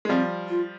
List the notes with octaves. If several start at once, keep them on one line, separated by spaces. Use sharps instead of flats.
G#3
F3 G3 C4
F4